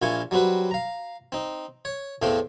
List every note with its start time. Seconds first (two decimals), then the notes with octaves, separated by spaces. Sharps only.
0.02 A#1 A#2 E4 F4 G#5 C#6
0.31 F#3 G3 C4 F#4 B4
0.71 F5 A#5
1.32 C4 D#4
1.85 C#5
2.22 E2 A2 A3 C4 F5 G5